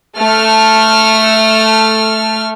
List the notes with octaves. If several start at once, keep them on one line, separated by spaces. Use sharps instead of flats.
A3 A4 F6